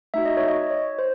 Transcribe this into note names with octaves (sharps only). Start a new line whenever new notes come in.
A3 D#4 F#4 E5
D#5
C#5
D#5
C#5
C5